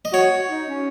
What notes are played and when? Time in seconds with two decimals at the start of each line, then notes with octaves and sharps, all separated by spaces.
0.05 D#5
0.13 F#4 C#5
0.50 D#4
0.68 C#4